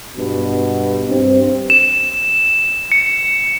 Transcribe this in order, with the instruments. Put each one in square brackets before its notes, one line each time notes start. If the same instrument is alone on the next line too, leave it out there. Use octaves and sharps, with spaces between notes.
[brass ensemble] G2 B2
G2 C4
[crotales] E7
C#7